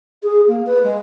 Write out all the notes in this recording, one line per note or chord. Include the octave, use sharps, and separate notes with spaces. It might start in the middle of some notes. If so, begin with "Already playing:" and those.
G#4
A#3
B4
G#3